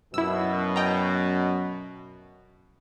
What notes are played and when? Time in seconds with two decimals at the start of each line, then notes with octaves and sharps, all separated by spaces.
0.14 F#2 B2 E4 E6
0.76 D#5 G5 A#5